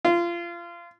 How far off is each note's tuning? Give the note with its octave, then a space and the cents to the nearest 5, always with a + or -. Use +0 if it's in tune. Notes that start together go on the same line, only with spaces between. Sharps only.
F4 -25